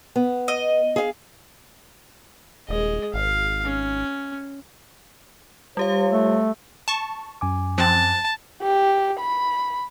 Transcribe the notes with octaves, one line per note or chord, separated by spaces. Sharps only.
B3
D#5
G#4 F5
D#1 G#3 D#5
G#1 F5
C#4
G3 F4 G4 C#5 F5
A3
A5 C#6
F#2 G#5 D6
F3 C4 A5 F#6
G4
B5